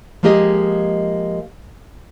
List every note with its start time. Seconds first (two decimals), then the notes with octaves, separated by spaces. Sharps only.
0.23 F3 G#3 A#3 G4 G#4 D#5